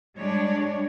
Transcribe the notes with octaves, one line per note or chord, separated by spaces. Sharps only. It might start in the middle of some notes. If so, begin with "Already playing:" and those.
G3 G#3 D4 C#5 D5